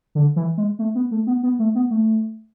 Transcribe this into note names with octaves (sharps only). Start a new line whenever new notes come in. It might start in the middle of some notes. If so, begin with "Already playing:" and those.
D3
E3
G#3
A3
B3
A3
B3
B3
A3
B3
A3